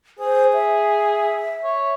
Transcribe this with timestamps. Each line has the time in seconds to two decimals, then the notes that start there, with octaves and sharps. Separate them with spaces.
0.19 G#4 C5
0.54 E5
1.64 C#5